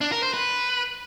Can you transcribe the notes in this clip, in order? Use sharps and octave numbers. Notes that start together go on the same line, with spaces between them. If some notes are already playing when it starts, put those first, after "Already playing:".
D4
A#4
C5
B4